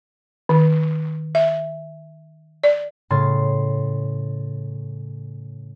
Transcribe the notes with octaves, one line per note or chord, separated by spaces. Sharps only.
D#3
E5
D5
A2 C#3 C6 A6